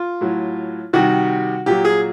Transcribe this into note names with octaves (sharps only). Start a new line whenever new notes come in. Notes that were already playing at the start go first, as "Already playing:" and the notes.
Already playing: F4
A2 F#3
C3 D#3 G3 F#4
A#2 F#3 G4
G#4